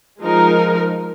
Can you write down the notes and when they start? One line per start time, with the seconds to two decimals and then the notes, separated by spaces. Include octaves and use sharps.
0.20 F3 G#3 D#4 A#4